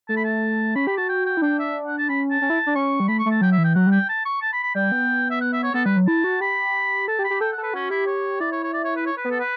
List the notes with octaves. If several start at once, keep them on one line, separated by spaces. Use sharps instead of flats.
A3 A5
B5
A5
C#4 B5
G4 B5
F#4 A5
G5
G5
E4
D4 G5
E5
F#5
A5
C#4 B5
A5
C#4
E4
D4
C#4 C#6
G3
A3 B5
C#6
A3
A5
F#3 G5
E5
E3
G5
F#3 F#5
G3
G5
A5
C#6
A5
B5
B5
G3 G5
B3
E5
F#5
E5
C#5
B3 A4
G3 B4
F#3
E4 A5
F#4
G4 B5
A4 A5
G4
B5
G4
A4 G5
F#5
A4
B4
C#4 F#4
E4 G4
C#5
E4 D5
C#5
C#5
D5
C#5
B4
C#5
B4
B3
A4
B4